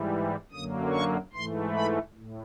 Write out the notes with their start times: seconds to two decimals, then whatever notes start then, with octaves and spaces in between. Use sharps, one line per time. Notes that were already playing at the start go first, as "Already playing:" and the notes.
Already playing: G#2 E3 G3
0.52 F#2 D3 F#3 A#3 D#6
0.92 C#6
1.33 G#2 E3 A3 C6
1.74 B5
2.15 A2